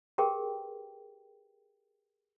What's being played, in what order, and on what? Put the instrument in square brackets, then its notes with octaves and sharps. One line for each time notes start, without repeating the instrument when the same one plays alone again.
[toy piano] G4 G#4 A#4 B4 G5